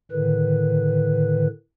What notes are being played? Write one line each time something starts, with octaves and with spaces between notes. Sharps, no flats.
A2 D3 D#3 B4